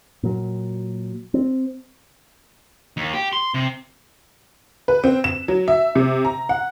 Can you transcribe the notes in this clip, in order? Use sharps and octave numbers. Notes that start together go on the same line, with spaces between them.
A#2 F#3
C4
D#2
G4
C6
C3
B4
C4
E7
F#3
E5
C3
A#5
F#5